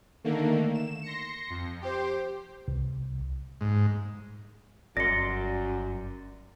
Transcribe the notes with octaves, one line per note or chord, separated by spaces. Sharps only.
D3 D#3 A3 A#3
E7
C6 A#6 C#7
F2
G4 C5
C2
G#2
G1 F#2 D5 C6 A#6 C#7